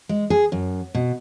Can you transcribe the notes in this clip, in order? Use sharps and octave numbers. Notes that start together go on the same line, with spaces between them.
G#3
G#4
F#2
B2